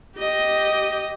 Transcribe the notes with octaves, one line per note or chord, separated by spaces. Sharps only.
G4 D#5